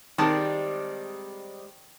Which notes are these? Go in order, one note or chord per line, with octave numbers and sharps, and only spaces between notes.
D#3 G3 G#3 C4 A5